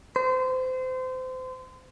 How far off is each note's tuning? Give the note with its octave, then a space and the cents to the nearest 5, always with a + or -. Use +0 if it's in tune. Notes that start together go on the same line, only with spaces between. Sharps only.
C5 -30